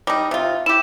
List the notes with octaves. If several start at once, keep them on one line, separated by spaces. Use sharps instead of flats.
G3 D#4
C3 F4
E4 G4 E7